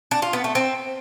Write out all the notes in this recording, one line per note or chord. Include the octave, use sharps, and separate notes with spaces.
D4
F4
B3
A3
C4